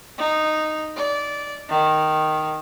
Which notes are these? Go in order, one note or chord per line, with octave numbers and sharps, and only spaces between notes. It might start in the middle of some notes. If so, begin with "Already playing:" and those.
D#4
D5
D#3